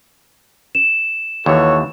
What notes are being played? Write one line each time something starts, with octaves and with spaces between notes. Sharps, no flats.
E7
D#2 E3 F#4 A4 C#5